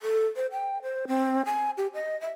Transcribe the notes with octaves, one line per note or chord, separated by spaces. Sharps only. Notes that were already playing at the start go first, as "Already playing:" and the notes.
A4
C5
G5
C5
C4
G#5
G4
D#5
E5